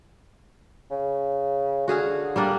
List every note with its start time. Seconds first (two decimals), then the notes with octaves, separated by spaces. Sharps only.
0.91 C#3
1.88 D3 F#4 G#4 F5
2.36 G3 A#3 D4